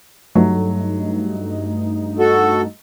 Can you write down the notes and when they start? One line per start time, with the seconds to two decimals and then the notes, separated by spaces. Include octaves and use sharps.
0.35 G2 F#3 A3 D#4
2.19 F#4 A4